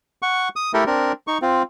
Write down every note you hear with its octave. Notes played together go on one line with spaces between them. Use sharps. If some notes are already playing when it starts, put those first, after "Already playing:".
F#5 C#6
D#6
A3 E4 G4 A4 A#4
C4 D4 A#4
D#4 C#6
C4 F4